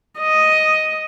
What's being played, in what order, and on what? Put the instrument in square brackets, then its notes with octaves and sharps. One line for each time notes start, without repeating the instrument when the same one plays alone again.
[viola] D#5